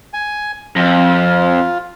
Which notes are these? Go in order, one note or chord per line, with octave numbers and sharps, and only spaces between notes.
G#5
F2 F4